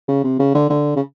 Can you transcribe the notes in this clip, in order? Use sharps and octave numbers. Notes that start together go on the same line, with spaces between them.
C#3
C3
C#3
D3
D3
C#3